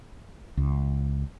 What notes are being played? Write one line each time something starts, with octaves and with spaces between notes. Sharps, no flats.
C#2